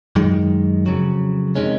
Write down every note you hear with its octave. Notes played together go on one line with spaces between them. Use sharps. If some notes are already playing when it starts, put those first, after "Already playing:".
F#2 D#3 G#3
F2 C#3 F#3
C3 D#3 G#3 C#4